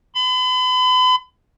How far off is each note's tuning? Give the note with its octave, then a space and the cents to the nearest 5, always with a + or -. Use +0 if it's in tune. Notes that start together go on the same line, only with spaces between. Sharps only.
B5 +40